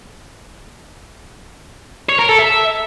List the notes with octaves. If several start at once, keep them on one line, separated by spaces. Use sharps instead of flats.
C#5
A#4
A4
E5